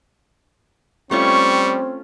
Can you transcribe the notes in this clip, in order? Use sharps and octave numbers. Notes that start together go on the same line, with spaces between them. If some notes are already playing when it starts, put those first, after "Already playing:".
G3 A3 C4 C#4 F4 C#6